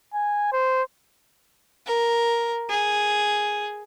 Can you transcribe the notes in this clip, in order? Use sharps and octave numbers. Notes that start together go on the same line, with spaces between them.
G#5
C5
A#4
G#4